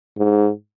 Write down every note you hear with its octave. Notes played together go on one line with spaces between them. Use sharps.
G#2